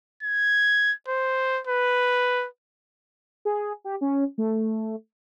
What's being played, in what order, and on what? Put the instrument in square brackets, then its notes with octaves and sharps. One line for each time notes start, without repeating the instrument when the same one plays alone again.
[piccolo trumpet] G#6
C5
B4
[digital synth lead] G#4
G4
C#4
A3